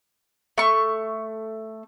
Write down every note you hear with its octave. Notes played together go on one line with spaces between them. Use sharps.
A3 C#6